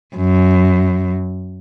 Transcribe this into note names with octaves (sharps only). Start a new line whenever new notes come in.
F#2